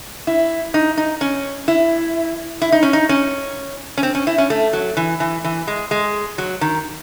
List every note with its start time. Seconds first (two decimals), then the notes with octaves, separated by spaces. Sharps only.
0.27 E4
0.74 D#4
0.97 D#4
1.21 C#4
1.68 E4
2.62 E4
2.72 D#4
2.83 C#4
2.93 D#4
3.09 C#4
3.98 C#4
4.03 C4
4.15 C#4
4.27 E4
4.38 C#4
4.50 A3
4.73 F#3
4.97 E3
5.20 E3
5.44 E3
5.67 G#3
5.91 G#3
6.38 F#3
6.61 D#3